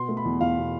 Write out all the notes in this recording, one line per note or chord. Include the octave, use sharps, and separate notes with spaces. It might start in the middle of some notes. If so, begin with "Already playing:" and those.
Already playing: B2 B3 C6
A3
B5
E2
E2 F5
B2